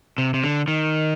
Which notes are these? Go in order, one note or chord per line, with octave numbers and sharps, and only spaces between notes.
C3
C3
D3
D#3